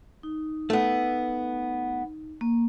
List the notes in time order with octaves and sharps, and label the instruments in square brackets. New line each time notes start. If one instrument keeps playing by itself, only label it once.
[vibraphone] D#4
[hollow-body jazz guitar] A3 B3
[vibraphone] A#3